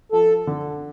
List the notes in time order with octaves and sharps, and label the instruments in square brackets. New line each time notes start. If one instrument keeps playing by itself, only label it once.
[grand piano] F3 [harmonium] A4
[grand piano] D3